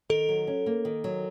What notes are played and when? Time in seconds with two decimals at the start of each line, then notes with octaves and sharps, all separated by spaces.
0.09 D#3 A4
0.29 F#3
0.47 C#4
0.66 A#3
0.85 D#3
1.04 F#3